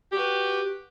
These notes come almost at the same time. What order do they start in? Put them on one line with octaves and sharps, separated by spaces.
G4 F#4 B4